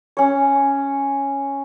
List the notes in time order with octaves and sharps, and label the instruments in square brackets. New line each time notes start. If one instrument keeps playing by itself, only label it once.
[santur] C#4 C#5